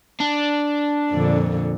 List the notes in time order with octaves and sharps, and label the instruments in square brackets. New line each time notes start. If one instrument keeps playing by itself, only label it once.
[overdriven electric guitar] D4
[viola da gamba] F2 A#2 D3